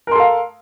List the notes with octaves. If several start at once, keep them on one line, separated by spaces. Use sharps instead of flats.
A4 A#4 F5 C6